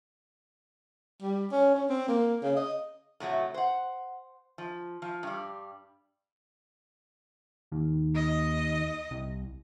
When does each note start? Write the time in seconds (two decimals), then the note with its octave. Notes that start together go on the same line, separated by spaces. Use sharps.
1.22 G3
1.52 C#4
1.75 C#4
1.90 C4
2.08 A#3
2.43 C#3
2.57 D#5
3.20 A2 C3 F#3 A3
3.54 C5 F#5
4.58 F3
5.02 F3
5.23 G2 G3
7.72 D#2
8.15 D#5
9.11 C2